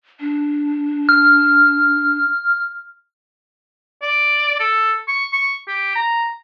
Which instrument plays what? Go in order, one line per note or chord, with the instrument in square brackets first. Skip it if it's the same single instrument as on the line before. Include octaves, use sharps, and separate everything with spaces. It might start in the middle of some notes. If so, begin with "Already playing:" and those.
[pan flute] D4
[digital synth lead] F6
[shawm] D5
A4
C#6
C#6
G4
A#5